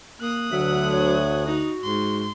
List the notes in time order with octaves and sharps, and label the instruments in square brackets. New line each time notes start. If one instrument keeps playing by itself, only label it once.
[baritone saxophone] A#3 [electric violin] D#6 F#6
[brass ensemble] D2 [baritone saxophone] F#3 [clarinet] E5
[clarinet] C#5
[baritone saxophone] D#4 [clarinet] F#4
[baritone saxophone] G#2 [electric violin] C6